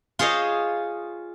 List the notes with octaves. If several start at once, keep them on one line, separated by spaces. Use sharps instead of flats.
F4 G#4 C5 C#5 D#5